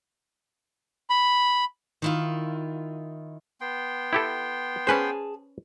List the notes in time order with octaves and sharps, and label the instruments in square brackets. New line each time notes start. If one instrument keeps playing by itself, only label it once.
[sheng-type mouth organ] B5
[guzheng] D#3 E4 F4
[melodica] B3 G5 C6
[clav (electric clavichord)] E4 G4 A4
[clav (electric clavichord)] C#4 B4 C5 [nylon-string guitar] G#4 G#5 A5